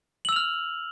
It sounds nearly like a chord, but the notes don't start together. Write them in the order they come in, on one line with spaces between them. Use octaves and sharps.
F#7 E6 F7 F6